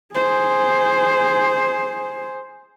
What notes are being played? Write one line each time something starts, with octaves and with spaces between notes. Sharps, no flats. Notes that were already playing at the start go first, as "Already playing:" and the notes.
G#4 C5